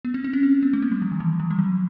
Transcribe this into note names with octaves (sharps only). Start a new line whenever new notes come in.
B3
C4
C4
C#4
C4
B3
A3
A#3
G3
F3
D#3
E3
F3
G3
F#3